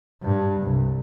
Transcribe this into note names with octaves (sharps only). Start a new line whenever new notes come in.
G2
C2